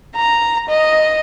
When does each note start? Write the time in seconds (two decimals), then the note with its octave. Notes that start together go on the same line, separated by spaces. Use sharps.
0.16 A#5
0.69 D#5